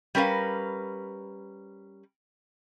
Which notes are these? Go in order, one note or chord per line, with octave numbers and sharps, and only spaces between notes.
G3 C#4 A#4 B4 F5